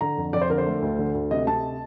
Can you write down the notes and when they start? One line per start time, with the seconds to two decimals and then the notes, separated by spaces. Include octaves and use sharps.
0.01 D3 A#5
0.17 F2
0.33 F2 D5
0.41 C5
0.50 D3 A#4
0.58 C5
0.66 A3
0.82 D2
0.99 D3
1.14 D2
1.31 C3 D#5
1.47 C3 A5